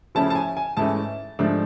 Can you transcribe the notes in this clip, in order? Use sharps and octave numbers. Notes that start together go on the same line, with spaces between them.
C#3 F3 A3 C#4 E4 A5
A5
G#5
G#5
G#2 E3 A3 C#4 A5
G#2 F3 A3 D4